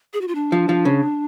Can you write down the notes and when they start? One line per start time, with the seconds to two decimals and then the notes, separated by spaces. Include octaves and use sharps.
0.14 G#4
0.21 F#4
0.28 F4
0.35 D4
0.52 F3
0.69 F3
0.85 C#3